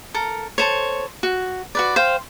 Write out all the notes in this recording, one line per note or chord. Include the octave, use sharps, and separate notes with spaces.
A4 A#4
A4 C5 C#5
F#4
F#4 B4 D5
C5 F5 G5